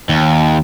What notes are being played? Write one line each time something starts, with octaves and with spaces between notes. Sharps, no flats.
D#2